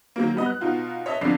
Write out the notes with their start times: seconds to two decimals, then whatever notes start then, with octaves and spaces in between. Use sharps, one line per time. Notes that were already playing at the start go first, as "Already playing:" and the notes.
0.16 D#3 F#3 A#3
0.34 F#3 G3 B3 D#5
0.46 F#6
0.60 B2 D#4 F4 F#4
1.06 C#5 D#5 E5 A5
1.21 B1 F2 D3 D4 C7